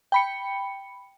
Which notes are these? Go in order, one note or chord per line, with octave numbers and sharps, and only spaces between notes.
G5 B5 C#7